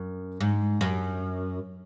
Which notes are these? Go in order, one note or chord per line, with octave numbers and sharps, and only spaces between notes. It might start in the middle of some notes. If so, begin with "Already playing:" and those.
Already playing: F#2
G#2
F#2